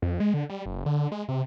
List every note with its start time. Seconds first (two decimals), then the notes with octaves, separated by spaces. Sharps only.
0.02 F2
0.20 G#3
0.34 D3
0.50 G3
0.66 F#1
0.86 D3
1.12 G#3
1.28 C3